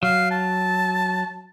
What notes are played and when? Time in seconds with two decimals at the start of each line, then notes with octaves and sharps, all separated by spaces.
0.03 F#3 F5
0.31 A5